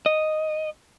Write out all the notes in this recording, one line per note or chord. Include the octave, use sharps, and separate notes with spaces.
D#5